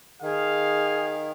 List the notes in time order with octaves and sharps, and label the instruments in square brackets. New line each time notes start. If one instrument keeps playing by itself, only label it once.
[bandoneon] D#3 [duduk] G#4 [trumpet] F5